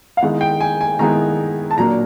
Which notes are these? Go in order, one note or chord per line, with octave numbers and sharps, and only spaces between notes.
F5
D#3 G#3 B3 E4 F#5
G5
G#5
G#5
D#3 G#3 B3 E4 A#5
A5
A#2 F#3 A#3 D4 A#5